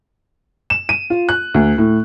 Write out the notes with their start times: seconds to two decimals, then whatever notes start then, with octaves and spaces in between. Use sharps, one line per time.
0.70 E7
0.89 D#7
1.10 F4
1.29 F#6
1.54 D2
1.78 A2